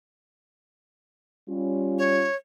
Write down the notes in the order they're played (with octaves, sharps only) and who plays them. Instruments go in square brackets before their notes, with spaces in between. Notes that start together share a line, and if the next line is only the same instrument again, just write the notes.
[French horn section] G3 C#4 F4
[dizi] C#5